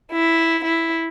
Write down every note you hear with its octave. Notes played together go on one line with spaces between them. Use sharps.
E4
E4